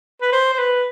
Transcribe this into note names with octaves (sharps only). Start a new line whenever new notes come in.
B4
C5
C5
B4